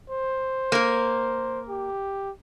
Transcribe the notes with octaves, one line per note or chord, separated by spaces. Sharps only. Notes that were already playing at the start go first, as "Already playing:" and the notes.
C5
A#3 A#4
G4